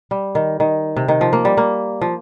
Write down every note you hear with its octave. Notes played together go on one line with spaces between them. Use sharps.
G3
D#3
D#3
C3
D#3
F3
A#3
G3
A#3
F3